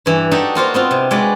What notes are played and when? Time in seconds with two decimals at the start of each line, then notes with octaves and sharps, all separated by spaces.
0.06 G2 E3
0.31 D4 D#4 F#4 G4 A4
0.55 A#3 F4 F#4 C5
0.74 B3 C4 F4
0.91 C3
1.11 G#3 F#4 B4 D5